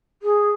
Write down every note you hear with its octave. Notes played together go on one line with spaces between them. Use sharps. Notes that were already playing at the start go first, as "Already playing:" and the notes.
G#4